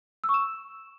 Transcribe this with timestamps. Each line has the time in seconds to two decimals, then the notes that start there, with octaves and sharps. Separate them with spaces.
0.24 E6
0.29 C#6
0.34 E7